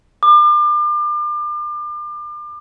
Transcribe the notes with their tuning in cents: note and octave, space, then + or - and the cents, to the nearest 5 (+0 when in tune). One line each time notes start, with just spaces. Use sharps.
D6 +35